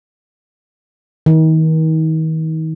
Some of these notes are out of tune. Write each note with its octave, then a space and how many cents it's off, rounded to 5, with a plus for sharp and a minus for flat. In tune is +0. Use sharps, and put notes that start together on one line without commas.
D#3 +40